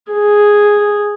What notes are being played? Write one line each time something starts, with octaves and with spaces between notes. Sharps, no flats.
G#4